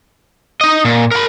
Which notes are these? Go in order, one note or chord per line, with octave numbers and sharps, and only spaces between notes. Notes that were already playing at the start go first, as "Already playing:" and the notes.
D#4 D#5
A#2
A#4 B5